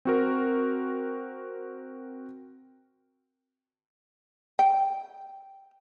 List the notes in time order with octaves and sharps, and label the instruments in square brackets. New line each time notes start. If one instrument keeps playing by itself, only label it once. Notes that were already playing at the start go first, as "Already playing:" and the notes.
[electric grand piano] C4 F#4 A#4
[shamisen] G5